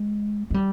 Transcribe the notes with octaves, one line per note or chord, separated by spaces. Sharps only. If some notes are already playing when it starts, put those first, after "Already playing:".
Already playing: G#3
G#3
G3